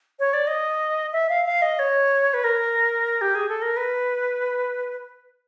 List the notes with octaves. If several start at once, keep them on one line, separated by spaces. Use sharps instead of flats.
C#5
D5
D#5
E5
F5
F5
D#5
C#5
B4
A#4
G4
G#4
A4
A#4
B4